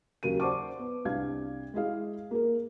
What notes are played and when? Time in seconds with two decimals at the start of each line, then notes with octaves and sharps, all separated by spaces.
0.23 D#2 C#3 F#3 A#4 D#7
0.40 C5 D5 F#5 A5 C#6 D6
0.79 B3
1.05 C2 D4 F5 G#6
1.74 G#3 E4 G#4 F5
2.31 A#3 G#4 A#4